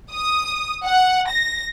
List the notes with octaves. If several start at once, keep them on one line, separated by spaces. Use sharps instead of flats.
D#6
F#5
A#6